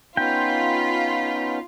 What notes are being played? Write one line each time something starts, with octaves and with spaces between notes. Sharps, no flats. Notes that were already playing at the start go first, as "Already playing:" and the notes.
B3 C#4 D#4 F4 G5 B5